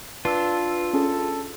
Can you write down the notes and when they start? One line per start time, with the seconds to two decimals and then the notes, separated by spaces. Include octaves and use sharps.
0.25 D4 F4 B4 E6
0.93 C#4 G#4 A4